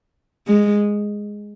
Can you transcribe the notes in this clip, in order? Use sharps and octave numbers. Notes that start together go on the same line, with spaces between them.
G#3